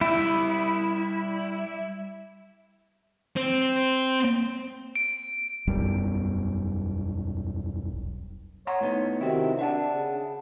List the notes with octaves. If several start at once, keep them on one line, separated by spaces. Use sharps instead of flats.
G3 E4 E5
C4
D7
E1 B1 F#2 G3
C#5 F#5 A#5 C6
A2 B3 D#4
C3 D#3 C4 E4 F#4
D4 E5 F#5 A5
C#3